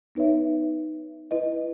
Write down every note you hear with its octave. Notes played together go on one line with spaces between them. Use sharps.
B3 D#4 B4 C#5 E5
E4 B4 D#5